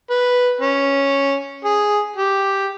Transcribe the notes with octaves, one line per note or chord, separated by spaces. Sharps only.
B4
C#4
G#4
G4